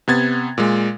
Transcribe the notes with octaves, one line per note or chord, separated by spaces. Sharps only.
C3 B3 G#6 A6
A#2 G#3